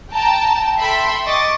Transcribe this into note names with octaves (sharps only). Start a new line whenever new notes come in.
G5 A5 A#5
A4 E5 G5 B5 C6
D#5 C#6 D6 A6